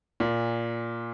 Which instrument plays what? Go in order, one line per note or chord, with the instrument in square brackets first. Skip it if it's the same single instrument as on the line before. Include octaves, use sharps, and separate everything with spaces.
[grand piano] A#2